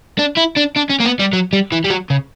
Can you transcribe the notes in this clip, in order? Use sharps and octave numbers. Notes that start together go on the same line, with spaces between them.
D4
E4
D4
D4
C#4
A#3
B3
G3
F#3
G3
E3
G3
F#3
C#3